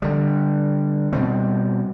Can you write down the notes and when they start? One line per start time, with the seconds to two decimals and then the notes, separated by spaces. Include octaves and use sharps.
0.02 D3 G3
1.13 B2 G3 C4